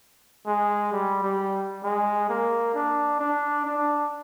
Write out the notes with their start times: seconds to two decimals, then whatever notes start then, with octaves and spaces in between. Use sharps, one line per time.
0.47 G#3
0.92 G3
1.23 G3
1.84 G#3
2.29 A#3
2.74 D4
3.19 D4
3.65 D4